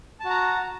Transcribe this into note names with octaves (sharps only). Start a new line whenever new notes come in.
F#4 A5 A#5